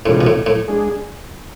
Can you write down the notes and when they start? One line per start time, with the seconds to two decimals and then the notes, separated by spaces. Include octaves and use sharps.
0.06 A2 C3 E3 G#3 D4 F4
0.21 B2
0.26 A2
0.46 A2
0.68 G#3 D4 G#4